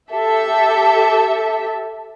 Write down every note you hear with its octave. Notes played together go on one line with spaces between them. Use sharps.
G4 A4 E5